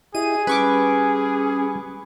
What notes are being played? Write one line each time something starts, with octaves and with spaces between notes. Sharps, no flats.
E4 G4 G#4 D#5 D#7
G3 C#4 B4 C#6 D6